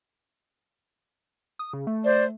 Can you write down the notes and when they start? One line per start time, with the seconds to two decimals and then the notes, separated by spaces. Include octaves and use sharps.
1.59 D#6
1.73 C#3
1.87 A3
2.04 C5 D5